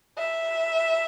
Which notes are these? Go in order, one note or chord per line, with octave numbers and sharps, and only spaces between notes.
E5